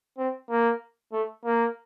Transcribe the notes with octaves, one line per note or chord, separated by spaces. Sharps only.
C4
A#3
A3
A#3